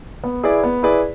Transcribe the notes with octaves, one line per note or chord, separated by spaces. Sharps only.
B3
E4 G#4 B4 D5
B3
E4 G#4 B4 D5